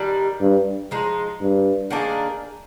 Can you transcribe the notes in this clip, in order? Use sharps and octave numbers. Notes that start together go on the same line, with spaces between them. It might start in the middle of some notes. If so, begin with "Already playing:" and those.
Already playing: D#3 G3 D4
G2
F3 G#3 D#4
G2
D#3 A#3 D4 G#4